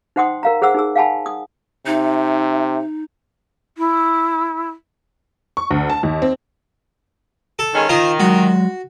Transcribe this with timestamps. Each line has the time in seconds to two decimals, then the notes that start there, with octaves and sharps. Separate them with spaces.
0.16 D#4 C5 F#5 G5 C6 D#6
0.43 A#4 F5 A#5
0.62 G#4 C5 F#5 E6
0.75 D#4 G#4 E6
0.96 F5 F#5 G#5 A5 B5
1.26 D#6
1.86 C3 D#4 E5
3.78 E4
5.57 C#6
5.71 D2
5.90 A5
6.03 D#2
6.22 C4
7.59 A4
7.74 D#3 G#3 C#4
7.89 D#3 F4 C5 A#5
8.20 F#3 G#3 F#4